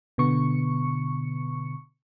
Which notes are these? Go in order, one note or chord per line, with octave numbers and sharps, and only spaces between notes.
B2 D3 B3 C#6 C#7